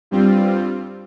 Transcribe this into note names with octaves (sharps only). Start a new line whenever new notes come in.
G2 G3 C4 F4